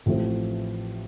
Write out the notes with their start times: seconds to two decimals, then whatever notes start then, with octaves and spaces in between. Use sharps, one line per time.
0.06 A1 A2 F3 A3 C4